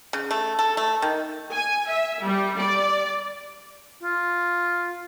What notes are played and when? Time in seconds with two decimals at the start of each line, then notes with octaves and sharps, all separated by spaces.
0.13 C#3
0.31 A3
0.59 A4
0.77 A3
1.02 D#3
1.53 G#5
1.89 E5
2.25 G3
2.58 D5
4.03 F4